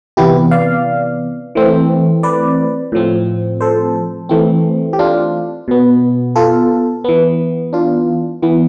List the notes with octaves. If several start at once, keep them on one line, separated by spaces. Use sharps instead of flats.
C3 E3 B3 E4 G4
D5 F5
E3 A3 C4
B4 D5
A2 F3 C4
A4 C5
E3 A3 C4
G4
D4 F4
B2 B3
F4 A4
E3 B3
D4 F4
E3 B3